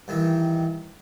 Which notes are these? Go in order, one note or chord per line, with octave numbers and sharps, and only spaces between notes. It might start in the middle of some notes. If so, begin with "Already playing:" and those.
G2 D#3 E3